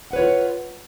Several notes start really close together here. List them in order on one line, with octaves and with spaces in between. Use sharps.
F#5 B4 C#5 F4